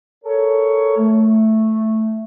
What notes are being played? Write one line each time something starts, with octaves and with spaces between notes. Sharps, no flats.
A4 A#4 C#5
A3